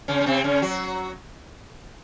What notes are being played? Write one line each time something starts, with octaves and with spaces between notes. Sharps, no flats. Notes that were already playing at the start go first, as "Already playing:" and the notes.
C#3 C#4
C#4
C3 C4
C#3 C#4
F#3 F#4